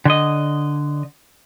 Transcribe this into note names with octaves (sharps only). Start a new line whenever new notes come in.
D3 D#5